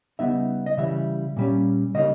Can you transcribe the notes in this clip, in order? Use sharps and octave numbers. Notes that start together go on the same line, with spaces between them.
C#3 G3 B3 D#4 E5
D#5
C#3 E3 G3 E5
A#2 G3 C#4
C#3 G3 A#3 D#4 D#5